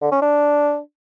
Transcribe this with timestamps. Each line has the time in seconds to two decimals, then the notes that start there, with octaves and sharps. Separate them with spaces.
0.01 D3
0.11 C#4
0.22 D4